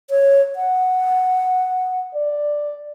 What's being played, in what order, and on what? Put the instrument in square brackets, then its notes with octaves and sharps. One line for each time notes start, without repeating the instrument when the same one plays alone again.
[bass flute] C#5
F#5
[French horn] D5